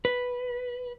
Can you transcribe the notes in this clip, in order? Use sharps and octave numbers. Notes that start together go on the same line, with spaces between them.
B4